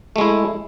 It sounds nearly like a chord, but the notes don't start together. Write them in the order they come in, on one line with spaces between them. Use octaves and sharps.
A3 G#3 E4